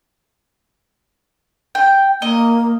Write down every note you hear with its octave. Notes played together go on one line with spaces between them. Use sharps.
G5
A#3 D#5